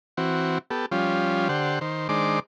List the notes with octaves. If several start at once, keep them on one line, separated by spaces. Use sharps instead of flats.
E3 C4 F#4
B3 G4 A4
F3 G3 C#4 F4
D3 G4 C5 F#5
D#3 C5
D#3 G#3 D4 C5 D6